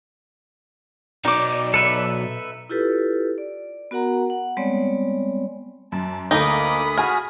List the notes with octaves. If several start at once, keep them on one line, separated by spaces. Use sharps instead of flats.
B2 F#3 D#4 D5 D6
A4 B4 E5
E4 F4 G4 A4 B4
D5
B3 F#4 A#4 F#5 A#5
F#5
G3 G#3 B3 C4 C#5 D5
F#2 A5
D2 A#3 D#4 A4 B5 D6 D#6
F#4 G#4 G#5 F6